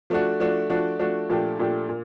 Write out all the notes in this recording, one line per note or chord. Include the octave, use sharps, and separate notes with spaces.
F3 A3 D4 F#4
F3 A3 D4 F#4
F3 A3 D4 F#4
F3 A3 D4 F#4
A#2 F3 A3 D4 G4
A#2 F3 A3 D4 G4
A#2